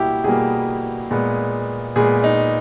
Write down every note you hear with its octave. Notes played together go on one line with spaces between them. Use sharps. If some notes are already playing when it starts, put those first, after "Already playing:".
Already playing: B2 G3 A#3 E4 G4
B2 G3 A#3 G#4
A#2 G#3 B3
A#2 G#3 B3 G#4
D#4